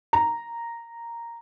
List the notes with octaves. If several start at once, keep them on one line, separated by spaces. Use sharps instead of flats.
A#5